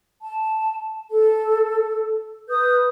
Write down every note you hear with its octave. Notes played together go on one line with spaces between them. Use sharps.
A5
A4
B4 D#6 G6